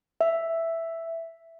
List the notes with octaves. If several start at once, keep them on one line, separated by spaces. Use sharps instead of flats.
E5